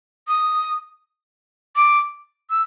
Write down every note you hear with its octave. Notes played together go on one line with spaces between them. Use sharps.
D#6
D6
E6